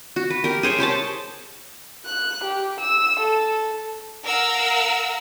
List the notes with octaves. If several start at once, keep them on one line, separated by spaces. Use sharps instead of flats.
F#4
B4
G4 A#4
G#4 C5 C#5 G5
G4 C5 C#5 A5
F#6
G4
E6
A4
A#4 F5 F#5 E6